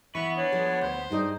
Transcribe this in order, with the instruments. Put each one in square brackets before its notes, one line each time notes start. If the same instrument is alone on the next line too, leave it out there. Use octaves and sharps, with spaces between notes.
[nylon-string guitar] E3 [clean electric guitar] B3 B4 [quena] E5 [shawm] C#6
[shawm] D4 [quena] C#5
[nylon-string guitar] F3 G#4
[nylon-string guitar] D2 [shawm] C5
[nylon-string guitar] G2 G#4 D5 [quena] D#4